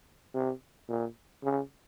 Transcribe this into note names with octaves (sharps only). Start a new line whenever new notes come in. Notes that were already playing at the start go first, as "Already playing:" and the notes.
C3
A#2
C#3